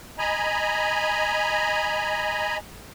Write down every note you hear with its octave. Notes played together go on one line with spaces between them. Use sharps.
D#5 G#5 A#5 B5